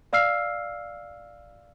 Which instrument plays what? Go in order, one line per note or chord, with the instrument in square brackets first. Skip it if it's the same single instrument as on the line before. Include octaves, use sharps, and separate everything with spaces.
[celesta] D5 F5 E6 F6 C7